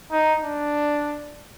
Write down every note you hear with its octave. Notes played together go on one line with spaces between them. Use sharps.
D#4
D4